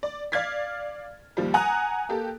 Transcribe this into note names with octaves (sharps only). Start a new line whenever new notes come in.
D5
D5 F5 F6 G#6 A6 B6
D#2 F3 G3
F#5 G#5 A#5 D#6 F#6
A#3 G4 A4